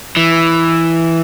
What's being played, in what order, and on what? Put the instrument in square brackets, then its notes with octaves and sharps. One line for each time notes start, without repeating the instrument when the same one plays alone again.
[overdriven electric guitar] E3